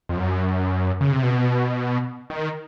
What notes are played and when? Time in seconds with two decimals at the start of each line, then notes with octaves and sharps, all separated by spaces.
0.09 F2
0.17 F#2
1.01 C#3
1.12 C3
1.23 B2
2.30 D#3